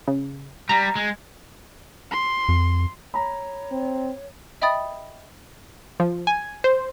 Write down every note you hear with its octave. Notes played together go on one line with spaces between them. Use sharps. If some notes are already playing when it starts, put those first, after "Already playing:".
C#3
G3 A#5
G#3
C6
F2
C#5 A#5 B5
C4
D#5 E5 G5 B5 D#6 A6
F3
G#5
C5